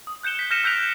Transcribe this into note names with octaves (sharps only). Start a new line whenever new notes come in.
D#6
F#6 G6 C#7 E7 G7
B6
F6 G6 A#6 C#7 D#7 E7
E6 F#6 G6 B6 D7 F7
A#6 F7